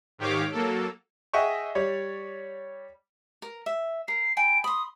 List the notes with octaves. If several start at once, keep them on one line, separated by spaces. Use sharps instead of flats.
G#2 D#3 G4 C#5 F5 D6
F#3 A#3 A4
G#4 D#5 E5 F#5 G5 C#6
G3 C#5 D5
A#4
E5
A#4 C7
G5 G#5 B5 D7
B5 C6 D#6